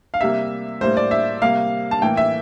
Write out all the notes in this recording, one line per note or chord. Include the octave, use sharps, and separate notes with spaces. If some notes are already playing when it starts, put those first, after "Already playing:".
F5
C3 G3 A#3 E5
A2 G3 A#3 C5
D5
E5
C3 G3 A#3 F5
A5
A2 E3 A#3 G5
E5